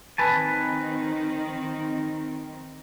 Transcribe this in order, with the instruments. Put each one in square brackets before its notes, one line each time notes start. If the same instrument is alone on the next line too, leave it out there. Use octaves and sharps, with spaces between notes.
[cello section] D#3 C4 [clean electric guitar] B4 G#5 A5